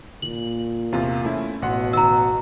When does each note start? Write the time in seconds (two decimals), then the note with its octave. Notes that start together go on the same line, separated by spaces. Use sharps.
0.22 A#2 F#7
0.93 E2 C3 F4
1.25 A3 C#4 E4
1.62 A1 B2 F#5 C6
1.93 A#5 E6